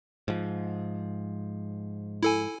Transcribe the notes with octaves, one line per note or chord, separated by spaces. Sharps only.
G#2 F3
E4 A4 G#5